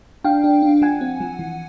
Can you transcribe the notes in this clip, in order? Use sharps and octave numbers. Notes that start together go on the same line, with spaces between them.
D4 F5 G5
D4
D4
F3 F#5 G#5
C4
F3
E3